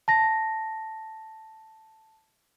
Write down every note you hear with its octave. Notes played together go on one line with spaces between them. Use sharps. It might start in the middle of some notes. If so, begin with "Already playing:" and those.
A5 A#6